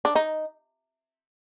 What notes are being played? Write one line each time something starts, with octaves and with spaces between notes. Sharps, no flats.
D4
D#4